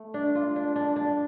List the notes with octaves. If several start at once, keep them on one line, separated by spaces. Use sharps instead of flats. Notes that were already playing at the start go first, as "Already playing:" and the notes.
Already playing: A3
D4
F4
D4
D4
D4